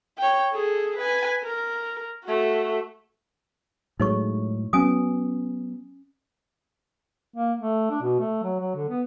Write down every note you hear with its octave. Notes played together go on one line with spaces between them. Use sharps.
C#5 G5
G#4 A4
B4 G#5
A#4
A3 F#4
A2 F#3 G#3 D#4 C#5 C#6
F#3 B3 C#4 G#5 D#6
A#3
A3
D4
B2
A3
F#3
F#3
D3
B3